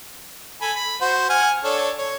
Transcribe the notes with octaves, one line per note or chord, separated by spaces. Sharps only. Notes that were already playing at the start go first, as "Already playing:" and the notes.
A4 G#5 B5
B5
F#4 C5
F#5 G#5 F6
D4 A4 C#5
C#5